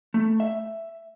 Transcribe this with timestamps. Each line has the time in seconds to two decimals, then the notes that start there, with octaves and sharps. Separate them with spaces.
0.14 A3
0.40 E5